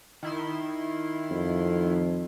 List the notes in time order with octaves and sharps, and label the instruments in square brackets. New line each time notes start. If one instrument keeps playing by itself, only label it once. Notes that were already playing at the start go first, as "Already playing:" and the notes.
[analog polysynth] D#3 E4 C6
[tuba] F2